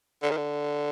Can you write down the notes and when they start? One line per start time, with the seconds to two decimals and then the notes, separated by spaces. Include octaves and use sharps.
0.23 D3
0.31 D#3
0.37 D3